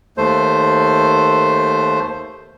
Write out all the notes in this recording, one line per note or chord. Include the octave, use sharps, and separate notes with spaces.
D#2 A3 C5